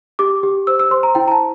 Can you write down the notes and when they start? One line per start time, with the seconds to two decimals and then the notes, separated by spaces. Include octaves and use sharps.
0.19 G4 D6
0.43 G4
0.67 C5 E6
0.79 E6
0.91 C5 C6
1.03 A#5
1.15 E4 G5
1.28 A#5
1.31 A5